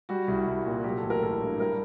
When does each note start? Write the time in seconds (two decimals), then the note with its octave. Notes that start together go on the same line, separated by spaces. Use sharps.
0.09 G3 F#4
0.28 C2
0.47 C2
0.66 A#2
0.84 F#3 G4
0.97 A4
1.03 A1
1.10 A#4
1.22 A1 A4
1.41 G2
1.60 G3 A#4